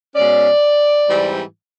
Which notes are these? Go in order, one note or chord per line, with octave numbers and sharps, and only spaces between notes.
B2 G#3 C#4 D5
G#2 E3 G3 C4